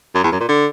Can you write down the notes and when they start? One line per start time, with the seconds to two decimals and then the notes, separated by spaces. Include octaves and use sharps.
0.15 F#2
0.24 E2
0.32 F#2
0.40 A#2
0.49 D3